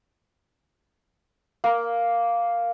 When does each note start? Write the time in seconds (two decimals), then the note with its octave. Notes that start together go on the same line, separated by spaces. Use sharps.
1.64 A#3